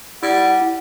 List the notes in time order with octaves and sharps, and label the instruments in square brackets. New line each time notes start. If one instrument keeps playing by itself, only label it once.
[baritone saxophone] G3 [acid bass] E4 [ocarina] F#5